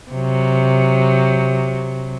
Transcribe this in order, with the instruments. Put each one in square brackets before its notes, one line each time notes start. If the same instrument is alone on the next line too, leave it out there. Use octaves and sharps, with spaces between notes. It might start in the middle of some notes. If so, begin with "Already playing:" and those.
[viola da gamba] C3 F#3